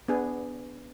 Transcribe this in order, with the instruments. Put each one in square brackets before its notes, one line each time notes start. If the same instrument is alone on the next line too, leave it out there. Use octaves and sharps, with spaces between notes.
[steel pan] B3 D4 G#4